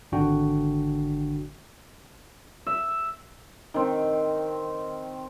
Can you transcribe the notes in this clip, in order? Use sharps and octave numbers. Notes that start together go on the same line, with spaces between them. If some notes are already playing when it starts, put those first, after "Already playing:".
G#1 D3 D4 F#4 G5
E5
D#3 C4